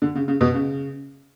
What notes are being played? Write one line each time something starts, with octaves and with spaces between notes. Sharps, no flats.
D3
C#3
C#3
B2
C#3